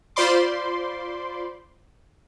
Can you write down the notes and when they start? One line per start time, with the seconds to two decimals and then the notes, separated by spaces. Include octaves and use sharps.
0.16 F4 C5 D5 B5 C6 D6